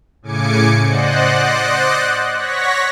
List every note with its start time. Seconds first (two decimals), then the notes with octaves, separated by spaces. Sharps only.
0.22 A2 C#3 G#5 D6 C#7
0.84 C5 D5 D#5 F#5 F#6
2.37 C#5 F#5 C#6 A#6 B6